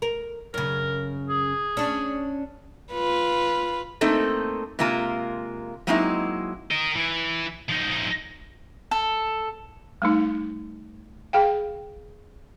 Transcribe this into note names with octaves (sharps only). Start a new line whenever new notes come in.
A#4
F#2 C#3 A#4
G#4
C#4 D4
F4 B4
A3 A#3 C4 D#4 A4
C3 G#3 A#3 F4 A#4
F#3 G#3 A#3 C4 D#4 E4
A#4 D#5
E3
F3 D#4
A4
G3 A3 D#4
G#4 F5 G5